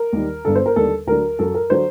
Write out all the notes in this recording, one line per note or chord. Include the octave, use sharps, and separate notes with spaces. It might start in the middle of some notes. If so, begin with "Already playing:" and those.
Already playing: A#4
D#2 D#3 G3
G1 G2 D3 A4
C5
A#4
D#2 D3 G3 A4
D2 D3 F#3 A#4
F#2 F#3 A4
A#4
D3 F#3 C5